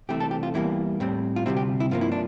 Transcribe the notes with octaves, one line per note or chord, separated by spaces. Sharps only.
C2 C3 E3 A3 C4 G4
A4
G4
F4
E2 E3 G3 A#3 E4
A2 G3 C4
F4
D2 C3 G3 C4 E4
G4
E4
G2 F3 A#3 F4
E4
D4